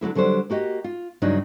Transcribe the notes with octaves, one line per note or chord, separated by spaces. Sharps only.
D3 F#3 A#3 E4
D3 F#3 G3 A4 C5
A#3 F#4 G4 D#5
F4
G2 C#3 F#3 D4 D#4